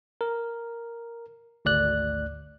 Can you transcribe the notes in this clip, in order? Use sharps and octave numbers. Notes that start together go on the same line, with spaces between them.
A#4
G#1 D2 D5 F#6